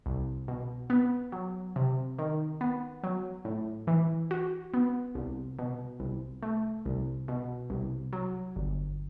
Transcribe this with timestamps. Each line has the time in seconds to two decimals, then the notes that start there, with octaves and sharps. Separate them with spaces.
0.06 C2
0.48 B2
0.90 B3
1.32 F#3
1.76 C3
2.19 D#3
2.61 B3
3.03 F#3
3.45 A2
3.87 E3
4.31 F#4
4.74 B3
5.15 C2
5.59 B2
6.00 C2
6.42 A3
6.86 C2
7.28 B2
7.70 C2
8.13 F#3
8.56 G1